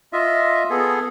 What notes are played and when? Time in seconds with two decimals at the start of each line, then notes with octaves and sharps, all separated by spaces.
0.13 F4 D#5 E5
0.70 B3 G#4 A4